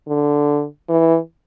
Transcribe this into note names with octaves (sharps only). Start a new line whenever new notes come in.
D3
E3